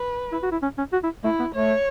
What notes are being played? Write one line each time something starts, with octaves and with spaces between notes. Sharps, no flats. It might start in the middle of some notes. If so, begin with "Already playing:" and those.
Already playing: B4
E4
F#4
E4
C#4
C#4
F#4
E4
A3 E4
B3
A3 C#5